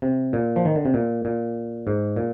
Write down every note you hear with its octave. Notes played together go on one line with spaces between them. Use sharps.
C3
A#2
F3
D#3
D3
C3
A#2
A#2
G#2
A#2